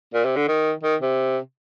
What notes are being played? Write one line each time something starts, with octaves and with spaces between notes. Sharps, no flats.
A#2
C3
D3
D#3
D#3
C3